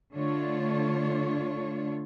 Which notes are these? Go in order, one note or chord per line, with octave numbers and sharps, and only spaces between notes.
D3 A3 D4 F4 C#5